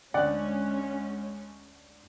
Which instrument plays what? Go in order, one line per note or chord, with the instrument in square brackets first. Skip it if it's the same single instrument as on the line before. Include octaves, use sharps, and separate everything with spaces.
[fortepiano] D2 D5 F#5 [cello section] G#3 C#4